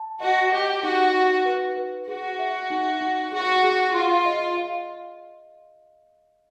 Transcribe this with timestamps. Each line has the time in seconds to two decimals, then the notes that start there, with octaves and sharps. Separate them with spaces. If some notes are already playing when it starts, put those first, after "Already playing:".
Already playing: A5
0.20 F#4 D#5
0.52 G4 D#5
0.83 D#4 F#4
1.14 D#4
1.46 B4
1.76 B4
2.07 F#4 G#4
2.39 E5
2.70 D#4
3.01 D#4
3.32 F#4 G#4
3.63 G#4
3.95 F4 C6
4.25 D#5
4.57 F5